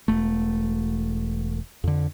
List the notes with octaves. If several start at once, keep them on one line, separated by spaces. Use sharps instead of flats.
E1 A3
F2 D3